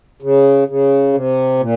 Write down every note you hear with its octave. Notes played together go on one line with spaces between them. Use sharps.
C#3
C#3
C3
A#2